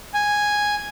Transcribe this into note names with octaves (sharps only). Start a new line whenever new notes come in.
G#5